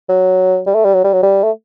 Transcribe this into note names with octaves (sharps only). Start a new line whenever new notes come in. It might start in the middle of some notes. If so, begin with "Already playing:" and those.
F#3
G3
A3
G3
F#3
G3
F#3
G3
A3